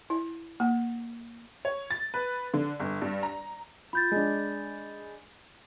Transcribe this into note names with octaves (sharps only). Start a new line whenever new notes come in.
E4
A#3
C#5
A6
B4
D3
G1
G2
A#5
F4 B5 G6 A6
G#3 D4